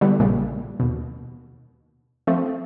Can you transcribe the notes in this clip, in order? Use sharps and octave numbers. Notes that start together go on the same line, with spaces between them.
D3 E3 G3 B3
A#1 A#2 C#3 G3
D#2 B2
F3 A3 C4